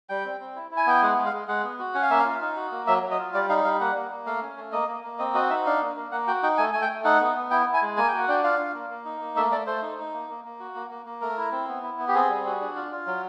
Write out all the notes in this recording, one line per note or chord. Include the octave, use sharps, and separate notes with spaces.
G3 G5
C4
C4
E4
E4
G#5
B3 G5
G#3 F#5
G#3
F5
G#3
G#3 F#5
B3
F#4
C#4 F#5
F5
A#3 E5
F5
F4
D#4
F#4
A#3
F#3 E5
F#3
D#5
F4
G3 D5
D#4 F5
G3 F5
A#3 F#5
A#3
A#3
A3 F5
C#4
A3
A#3 D#5
A#3
A#3
C4 D#5
F#4 D#5
D#4 E5
D4 F5
A#3
A#3
A#3 F#5
F#4 G5
D#4 G5
A3 G#5
A3 G#5
G5
A3
D#4 F#5
B3
B3
E4 G5
E4
G#5
G#3
A#3 G#5
F#4 G5
F#5
D4 G5
F4 F5
F4
A#3
A#3
D#4
A#3
A3 E5
A3 D5
A3 C5
D#4
D#4
A#3
A#3
A#3
F#4
A#3
A#3
A#3
A3 A#4
E4
C4
B3
E4
B3
G4
C4 G#4
G3
F#4
D4
F4
F4
F#3